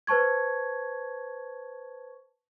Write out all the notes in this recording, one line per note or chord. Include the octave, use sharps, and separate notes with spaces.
B4 C5 A5 C#6 G#6